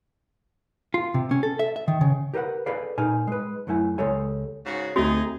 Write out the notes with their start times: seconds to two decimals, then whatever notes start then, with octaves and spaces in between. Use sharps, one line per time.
0.94 F4
1.14 C3
1.31 C#4
1.43 A4
1.59 E5
1.76 E5
1.88 D#3
2.01 C#3
2.34 G4 A#4 B4 F5 F#5
2.66 G#4 A4 B4 D5 D#5 F5
2.98 A#2 D#4 F5 G#5
3.27 G#3 B4
3.67 F#2 F#3 A3 E4 G#5
3.98 C#2 G#3 G4 A4 C#5 G#5
4.66 G#2 C#3 F#4
4.96 D2 A3 C4 D#4 F#4 G#4